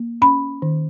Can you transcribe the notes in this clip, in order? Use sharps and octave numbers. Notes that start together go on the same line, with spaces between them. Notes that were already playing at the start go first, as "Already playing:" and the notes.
Already playing: A#3
C#4 B5
D#3